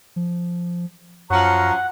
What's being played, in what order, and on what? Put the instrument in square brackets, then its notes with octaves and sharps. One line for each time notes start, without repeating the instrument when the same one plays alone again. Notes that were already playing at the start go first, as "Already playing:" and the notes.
[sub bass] F3
[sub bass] F#2 [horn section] F3 F#3 C#4 [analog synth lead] F#5 [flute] A#5